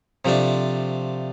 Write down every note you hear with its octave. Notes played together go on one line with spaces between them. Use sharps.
C3 F3 A3 D4